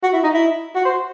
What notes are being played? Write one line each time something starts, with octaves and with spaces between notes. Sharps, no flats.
F#4
E4
D#4
E4
F#4
C5